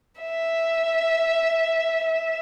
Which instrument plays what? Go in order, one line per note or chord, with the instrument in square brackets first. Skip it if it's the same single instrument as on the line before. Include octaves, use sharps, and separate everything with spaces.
[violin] E5
E5